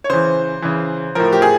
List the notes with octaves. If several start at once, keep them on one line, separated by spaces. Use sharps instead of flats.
C#5
C#3 E3 C5
C#3 E3
A2 F3 A#4
G4
G#4